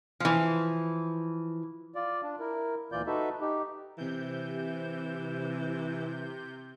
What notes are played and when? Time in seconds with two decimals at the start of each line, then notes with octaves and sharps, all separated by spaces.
0.20 E3 F3
1.95 F4 D5
2.23 D4
2.40 E4 A#4
2.92 D2 A#2 E3 F4 D5 G6
3.07 D#4 F#4 A4 B4 E5
3.41 D#4 G4
3.98 C3 E3 G6